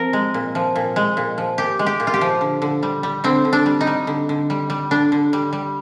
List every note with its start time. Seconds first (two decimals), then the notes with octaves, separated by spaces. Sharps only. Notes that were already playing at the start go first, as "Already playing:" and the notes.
Already playing: F3 C4 A#4
0.13 G#3
0.34 A#2
0.55 F3
0.76 A#2
0.96 G#3
1.17 A#2
1.38 F3
1.58 A#2 G4
1.79 G#3
1.86 G4
2.00 A#2
2.07 F4
2.14 G4
2.21 F3
2.41 D3
2.62 D3
2.83 G3
3.03 G3
3.24 D3 C4
3.45 D3
3.53 D4
3.66 G3
3.81 D#4
3.87 G3
4.07 D3
4.29 D3
4.50 G3
4.70 G3
4.91 D3 D4
5.12 D3
5.33 G3
5.53 G3